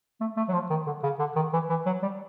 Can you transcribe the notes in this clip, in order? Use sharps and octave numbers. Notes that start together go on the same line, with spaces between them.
A3
A3
F#3
F3
D#3
D3
C#3
D3
D#3
E3
E3
F#3
G3